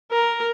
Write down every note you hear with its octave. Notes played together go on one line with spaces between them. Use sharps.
A#4